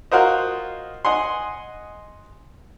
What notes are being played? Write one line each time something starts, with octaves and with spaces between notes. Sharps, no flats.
F4 F#4 A#4 C5 D#5
D#5 F#5 G#5 C6